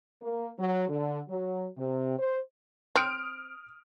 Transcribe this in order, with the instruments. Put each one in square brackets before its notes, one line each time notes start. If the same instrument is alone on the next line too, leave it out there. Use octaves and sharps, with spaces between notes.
[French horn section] A#3
F#3
D3
F#3
C3
C5
[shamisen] C4 [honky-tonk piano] D#6 F6 D7